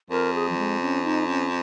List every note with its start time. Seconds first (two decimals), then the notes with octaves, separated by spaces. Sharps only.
0.10 F2 A#4
0.34 G#4
0.49 F3
0.58 G#3
0.81 C#4
1.04 D#4
1.28 C#4